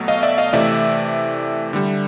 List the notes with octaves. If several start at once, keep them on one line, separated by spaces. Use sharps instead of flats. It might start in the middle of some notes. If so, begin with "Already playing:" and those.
Already playing: B2 F#3 A3
D#5 F5
D5 E5
D#5 F5
C3 E3 A3 D5 E5
D3 G3